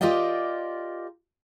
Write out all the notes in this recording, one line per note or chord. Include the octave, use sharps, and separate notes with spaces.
F4 G4 A#4 D5 D#5 G5